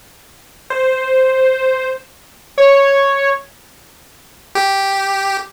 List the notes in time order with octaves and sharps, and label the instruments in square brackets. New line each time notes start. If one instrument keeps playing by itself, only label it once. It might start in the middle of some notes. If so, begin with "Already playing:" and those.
[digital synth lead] C5
[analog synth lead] C#5
[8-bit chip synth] G4